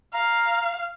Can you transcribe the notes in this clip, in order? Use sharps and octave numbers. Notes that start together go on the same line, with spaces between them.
F5 A#5